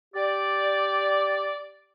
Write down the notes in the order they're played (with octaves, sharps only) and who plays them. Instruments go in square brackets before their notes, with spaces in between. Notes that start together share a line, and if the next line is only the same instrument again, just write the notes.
[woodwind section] G4 D5